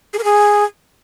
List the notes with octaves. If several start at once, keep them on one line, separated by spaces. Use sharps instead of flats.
G#4
A#4
G#4